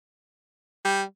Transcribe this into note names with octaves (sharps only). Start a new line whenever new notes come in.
G3